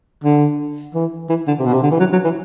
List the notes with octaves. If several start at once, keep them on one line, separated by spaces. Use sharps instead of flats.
D3
E3
E3
D3
C3
B2
C3
D3
E3
F#3
F#3
E3